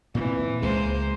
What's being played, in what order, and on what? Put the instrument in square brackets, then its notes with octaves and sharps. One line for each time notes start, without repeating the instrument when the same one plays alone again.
[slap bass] A#2 C4 [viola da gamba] E3
[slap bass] C#2 C#3 [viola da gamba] G#3 A#3 C5